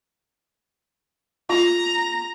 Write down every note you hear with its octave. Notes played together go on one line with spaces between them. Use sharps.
F4 A#5